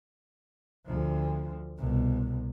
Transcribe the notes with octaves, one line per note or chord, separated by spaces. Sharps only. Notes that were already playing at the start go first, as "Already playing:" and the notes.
D2 F3
C2 B2